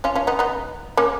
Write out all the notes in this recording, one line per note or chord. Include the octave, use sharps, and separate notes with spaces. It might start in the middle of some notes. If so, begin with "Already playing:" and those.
C#4 F4
C#4 F4
B3 D#4
B3 D#4
A#3 C#4